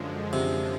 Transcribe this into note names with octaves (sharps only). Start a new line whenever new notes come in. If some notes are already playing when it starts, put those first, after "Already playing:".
Already playing: F#2 D3 F3 G#3
C3